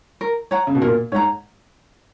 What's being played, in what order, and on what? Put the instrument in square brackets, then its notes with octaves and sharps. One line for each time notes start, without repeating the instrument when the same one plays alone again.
[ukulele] A#4
C#5 F#5 A#5
[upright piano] C#3
B2
[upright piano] A#2 [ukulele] A#4
[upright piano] G#2 [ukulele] C#5 F#5 A#5